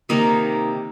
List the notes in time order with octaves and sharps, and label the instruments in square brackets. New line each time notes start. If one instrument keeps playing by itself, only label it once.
[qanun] C3 D#3 A#3 D#4